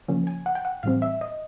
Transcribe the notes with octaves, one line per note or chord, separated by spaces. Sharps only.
C#3 F3 A#3 C#4
G#5
F#5
G5
F#5
A2 E3 G3 C4 F5
E5
D#5